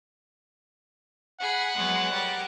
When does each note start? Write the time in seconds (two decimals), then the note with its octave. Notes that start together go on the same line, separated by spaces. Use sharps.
1.41 G#4 F#5 B5
1.75 F#3 G#3 B3
2.12 G3 A#4